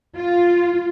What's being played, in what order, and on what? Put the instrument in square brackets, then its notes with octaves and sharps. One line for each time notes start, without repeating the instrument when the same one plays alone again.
[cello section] F4